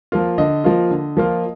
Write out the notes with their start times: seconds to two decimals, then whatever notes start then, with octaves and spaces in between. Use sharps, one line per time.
0.12 F3 A#3 F4
0.38 D3 D#5
0.64 F3 A#3 F4
0.91 D3
1.17 F3 A#3 F4